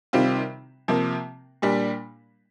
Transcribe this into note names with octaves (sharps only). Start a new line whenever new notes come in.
C3 D#3 G3 C4 F4
C3 F3 A#3
A#2 G3 D4